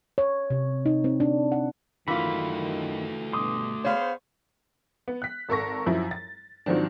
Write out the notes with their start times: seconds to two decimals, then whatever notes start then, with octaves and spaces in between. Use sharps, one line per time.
0.18 C#5
0.50 C3
0.86 D#4
1.04 C4
1.20 D4
1.52 F#5
2.08 F#2 D#3 E3 A3 F4 F#4 B5
3.33 G2 B2 C6 D6 D#6
3.84 B3 G#4 C5 C#5 F5
5.08 B3
5.22 F#6 B6
5.49 G#1 A4 A#4 C#6 A#6
5.87 F#2 F3 E4
6.11 A6
6.66 G#2 D#3 F3 F#3 C4 D4